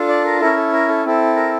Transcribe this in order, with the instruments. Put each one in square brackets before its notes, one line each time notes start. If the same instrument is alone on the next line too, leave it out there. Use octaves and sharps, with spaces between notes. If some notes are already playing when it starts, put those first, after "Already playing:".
Already playing: [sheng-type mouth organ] D4 F4 A4
D5
A#4
C#4 E4 A4 A#4
A4
A#4
A4
C4 E4 A4
A#4